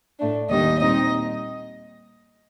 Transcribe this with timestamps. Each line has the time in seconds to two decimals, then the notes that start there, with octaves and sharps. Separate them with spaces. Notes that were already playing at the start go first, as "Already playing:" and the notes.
0.18 A2 A3 D4
0.49 D#2 D#3 G3 D4 D#5
0.80 A#2 G3 C4 D#4 D#5